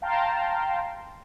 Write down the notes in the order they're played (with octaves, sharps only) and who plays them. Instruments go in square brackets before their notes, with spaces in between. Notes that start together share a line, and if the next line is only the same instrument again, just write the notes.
[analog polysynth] F5 G5 A5 A#5 C6